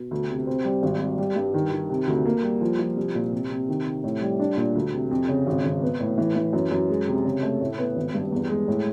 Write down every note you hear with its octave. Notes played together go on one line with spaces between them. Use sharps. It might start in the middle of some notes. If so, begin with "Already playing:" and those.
Already playing: B2
D2
C3
C4
G3
G#1
G3
G3
G2
D#3
D#3
C3
D2
A#3
G3
F3
F3
C2
A#2
C3
C3
D#3
C3
A2
G3
D4
A#2
D2
C3
F2
C#3
G#1
G#1
B3
A2
E3
E3
F#2
F#2
G#3
C3
C#3
A3
A2
B3
G#1
G2
E2
G#3
A2